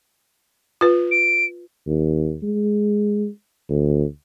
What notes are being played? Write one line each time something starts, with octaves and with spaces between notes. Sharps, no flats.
F4 B4
D7
D#2
G#3
D2